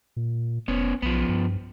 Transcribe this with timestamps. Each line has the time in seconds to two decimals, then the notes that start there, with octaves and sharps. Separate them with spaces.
0.16 A#2
0.68 F1 B3 C#4
1.02 B1 F3 B3
1.29 G2